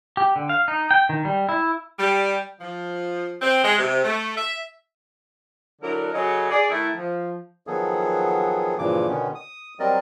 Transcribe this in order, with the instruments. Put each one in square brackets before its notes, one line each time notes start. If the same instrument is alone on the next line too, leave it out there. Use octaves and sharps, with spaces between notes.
[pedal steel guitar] G4
D3
F5
D#4
G5
D#3
G3
E4
[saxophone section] G3
F3
C4
G#3
C3
A3
E5
D3 F#3 D4 E4 A#4
C#3 F#3 G#4 A4 D#5
G#4 D5
D#3 A3 E4
F3
[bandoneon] D#3 F3 F#3 B3 G#4 A4
G2 A#2 C#3 E3 F3 D6
B2 D3 D#3 B3 C#4
D#6
F#3 G3 C4 A#4 D5 D#5